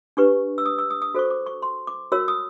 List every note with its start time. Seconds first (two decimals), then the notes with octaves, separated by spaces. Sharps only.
0.17 D4 G4 B4 C#6
0.58 E6
0.66 D#6
0.79 E6
0.90 D#6
1.02 D#6
1.14 F#4 A4 C5 C#6
1.30 D6
1.46 C#6
1.62 C6
1.87 D6
2.12 F#4 A#4 C#5 E6
2.28 D#6